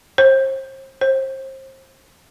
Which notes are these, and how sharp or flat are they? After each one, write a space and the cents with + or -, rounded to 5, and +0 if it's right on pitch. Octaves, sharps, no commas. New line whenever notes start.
C5 +35
C5 +30